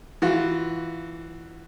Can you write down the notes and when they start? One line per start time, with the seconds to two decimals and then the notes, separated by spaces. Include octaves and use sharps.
0.22 E3 F4 F#4